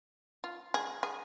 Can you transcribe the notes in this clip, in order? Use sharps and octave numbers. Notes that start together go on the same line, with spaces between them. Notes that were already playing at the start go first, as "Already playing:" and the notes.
F4
G#4
G#4